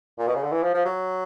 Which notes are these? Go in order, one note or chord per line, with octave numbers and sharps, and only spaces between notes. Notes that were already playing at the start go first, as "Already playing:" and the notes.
A#2
B2
C#3
D3
E3
F3
F3
F#3